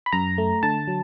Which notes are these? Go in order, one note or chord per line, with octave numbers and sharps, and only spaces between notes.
B5
F#2 A#5
A3
D3 A5
F#3